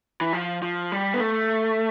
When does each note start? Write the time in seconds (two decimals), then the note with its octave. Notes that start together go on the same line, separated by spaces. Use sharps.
0.21 E3
0.33 F3
0.62 F3
0.92 G3
1.14 B3
1.20 A3